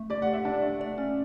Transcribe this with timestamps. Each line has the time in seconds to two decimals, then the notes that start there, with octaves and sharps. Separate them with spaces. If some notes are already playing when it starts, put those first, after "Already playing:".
Already playing: A3
0.10 G4 D5
0.22 F#5
0.27 G4
0.33 E5
0.45 D4 D5
0.62 A3
0.81 D5
0.98 C#4